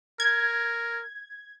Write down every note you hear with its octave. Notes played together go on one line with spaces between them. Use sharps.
A#4 G#6